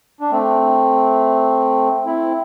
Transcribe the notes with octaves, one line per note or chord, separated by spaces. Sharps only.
D4
A3 C4
C4 E4